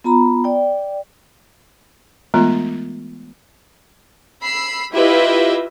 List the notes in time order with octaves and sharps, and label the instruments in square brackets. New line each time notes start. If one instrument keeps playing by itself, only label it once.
[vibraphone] B3 F4 A#5 B5
D5 G5
[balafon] E3 G#3 A3 B3 F4
[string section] B5 E6 C7
E4 F4 G4 B4 D#5 E5